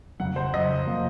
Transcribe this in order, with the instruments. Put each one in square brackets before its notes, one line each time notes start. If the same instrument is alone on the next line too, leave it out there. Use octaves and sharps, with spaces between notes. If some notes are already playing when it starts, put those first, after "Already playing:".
[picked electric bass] F2 C#3 F#3 [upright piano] F#5
[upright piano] C5
[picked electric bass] F2 C#3 F#3 [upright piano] D#5
[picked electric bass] C3 F3 A#3